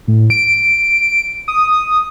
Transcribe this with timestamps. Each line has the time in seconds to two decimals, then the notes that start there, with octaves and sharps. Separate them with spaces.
0.08 A2
0.30 D7
1.48 D#6